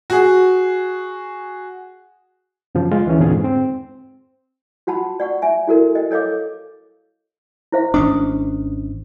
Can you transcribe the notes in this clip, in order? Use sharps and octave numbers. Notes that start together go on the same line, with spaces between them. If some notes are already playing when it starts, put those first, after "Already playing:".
F#4 G#4
F#2 C#3 F3
G#3 F4
D2 E3 C#4
E2 A#2 D3 C4 F4 G#4
G#2
C4
F4 F#4 F#5 A5 B5
D5 F#5 C#6
E5 G#5
E4 F#4 A4 A#4
D#5 G5
A4 C#5 D#5 F5 D6
E4 C5 F5
G#1 C#4 D4 D#6